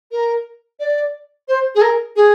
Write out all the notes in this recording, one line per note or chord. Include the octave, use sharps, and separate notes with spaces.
A#4
D5
C5
G#4
A#4
G#4